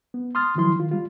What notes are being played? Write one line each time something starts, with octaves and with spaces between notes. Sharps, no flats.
B3
C6 D#6 F6 A6
D#3 F3 F#3 E4 C6
D#3 F4
G3 F4